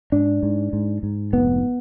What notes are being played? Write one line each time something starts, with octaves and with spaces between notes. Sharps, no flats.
G#2 D4
G#2
G#2
G#2
F1 B3